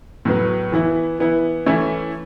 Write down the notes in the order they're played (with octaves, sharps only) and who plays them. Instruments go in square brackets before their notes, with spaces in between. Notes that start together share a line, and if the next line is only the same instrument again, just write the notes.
[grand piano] A2 F#3 B3
E3 B3 E4
E3 B3 E4
E3 A3 C#4 E4